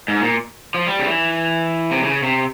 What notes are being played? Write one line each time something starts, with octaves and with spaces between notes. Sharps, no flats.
G#2
A#2
F3
G3
C#3
E3
C3
C#3
C3